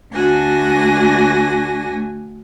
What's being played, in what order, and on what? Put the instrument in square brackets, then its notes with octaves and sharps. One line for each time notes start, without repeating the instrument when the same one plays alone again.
[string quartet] D2 A3 D4 F#4 G#5 A#6